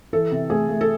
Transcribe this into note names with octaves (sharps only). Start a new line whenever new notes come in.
E3 A4
C3
A3 G#4
A3
A4